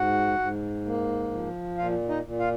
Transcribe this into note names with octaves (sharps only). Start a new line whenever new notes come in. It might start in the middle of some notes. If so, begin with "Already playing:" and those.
Already playing: G#2 F#4 F#5
G#2
A#3
F3
A#2 F4 F5
D#4 D#5
A#2
F4 F5